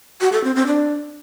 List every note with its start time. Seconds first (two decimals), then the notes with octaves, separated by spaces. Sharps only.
0.21 F#4
0.32 A4
0.44 C4
0.55 C4
0.67 D4